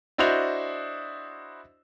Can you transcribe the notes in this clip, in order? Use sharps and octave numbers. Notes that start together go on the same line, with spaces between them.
D4 E4 F#4 C5 D#5 F7